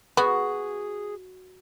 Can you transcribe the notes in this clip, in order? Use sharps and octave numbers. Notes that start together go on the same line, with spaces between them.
B3 F#4 G#4